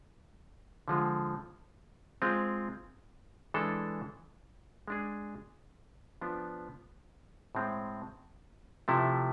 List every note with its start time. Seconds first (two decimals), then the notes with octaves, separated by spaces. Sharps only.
0.88 D3 F3 G#3
2.22 G#3 C4 F4
3.54 E3 G#3 D4 A4
4.88 G#3 D4 G#4
6.21 F3 B3 D4
7.55 A2 G#3 C4
8.88 C3 F3 A3 E4